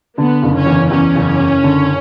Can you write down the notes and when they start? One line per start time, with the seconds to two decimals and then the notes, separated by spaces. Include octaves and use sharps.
0.18 D3 B3
0.42 F#1
0.55 C#4
0.66 E2
0.91 E2 C#4
1.15 F#1
1.39 F#1
1.64 D3